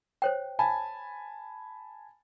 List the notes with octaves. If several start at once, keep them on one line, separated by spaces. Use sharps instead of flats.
C5 C#5 G5
G#5 A5 B5